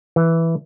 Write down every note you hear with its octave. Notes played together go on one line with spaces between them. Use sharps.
E3